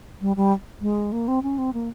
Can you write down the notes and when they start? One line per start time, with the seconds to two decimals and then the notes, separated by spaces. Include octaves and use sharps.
0.21 G3
0.36 G3
0.81 G#3
1.12 A#3
1.28 C4
1.43 C#4
1.58 C4
1.73 A#3